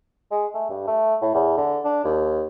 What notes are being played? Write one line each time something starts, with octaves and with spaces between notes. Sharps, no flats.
G#3
A3
G2
A3
A2
E2
D3
D4
D#2